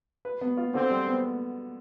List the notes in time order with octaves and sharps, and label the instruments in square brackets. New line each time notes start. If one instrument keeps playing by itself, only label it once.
[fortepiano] B4
B3
F4
[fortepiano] D3 [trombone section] C4
[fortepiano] G3
B3